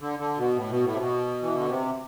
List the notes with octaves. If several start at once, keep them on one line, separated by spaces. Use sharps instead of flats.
D3
D3
B2
A2
B2
A2
C3
B2
E3
D3
C3